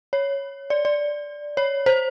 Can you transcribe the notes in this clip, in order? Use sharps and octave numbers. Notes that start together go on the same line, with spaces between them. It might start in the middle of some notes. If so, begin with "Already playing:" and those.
C#5
D5
D5
C#5
C5